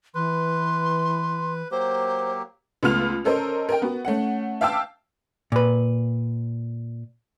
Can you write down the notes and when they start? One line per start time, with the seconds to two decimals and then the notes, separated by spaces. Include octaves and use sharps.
0.15 E3 B4 C6
1.71 F#3 A#3 G4 C5
2.83 C#2 A3 B3 F4 F6 F7
3.24 C#4 A4 A#4 C5 D#5
3.69 A#4 D#5 G5
3.82 B3 F#4
4.05 A3 C#4 F#5
4.61 E5 F5 G5 A5 D6 E6
5.52 A#2 B4